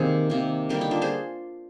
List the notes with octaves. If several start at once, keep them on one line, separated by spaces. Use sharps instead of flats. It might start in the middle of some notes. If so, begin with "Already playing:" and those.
Already playing: C3 D#3 A#3 G#4 A#4 C5
C3 D#3 A#3
D3 G3 A#3 G4 A#4
D#4 G4
D4 F4
G#4 C5